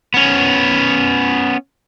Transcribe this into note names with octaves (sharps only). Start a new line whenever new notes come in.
B3 C#4